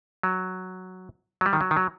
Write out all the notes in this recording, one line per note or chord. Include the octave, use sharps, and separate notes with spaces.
F#3
F#3
G3
D#3
F#3
D#3
F#3